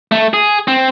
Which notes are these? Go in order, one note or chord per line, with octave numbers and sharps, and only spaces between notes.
A3
G#4
C4